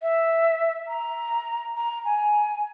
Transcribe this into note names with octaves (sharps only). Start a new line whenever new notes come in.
E5
A#5
A#5
G#5